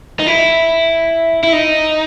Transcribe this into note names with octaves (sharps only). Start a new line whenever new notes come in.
D#4
E4
E4
D#4